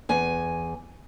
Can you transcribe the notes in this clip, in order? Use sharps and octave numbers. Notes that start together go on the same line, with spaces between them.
E2 G#5